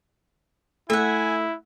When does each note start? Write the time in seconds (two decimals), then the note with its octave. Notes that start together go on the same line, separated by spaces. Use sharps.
0.90 A3 E4 E5 F#5 G#5